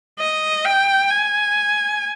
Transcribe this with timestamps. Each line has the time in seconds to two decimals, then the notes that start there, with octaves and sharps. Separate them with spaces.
0.19 D#5
0.65 G5
1.11 G#5